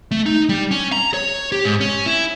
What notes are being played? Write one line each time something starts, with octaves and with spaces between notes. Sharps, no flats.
A3
D#4
G3
C#4
A#5
C#5
G4
G#2
C#4
E4